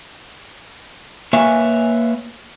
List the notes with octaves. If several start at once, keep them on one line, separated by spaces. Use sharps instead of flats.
A#3 B4 C#5 E5 F5 G#5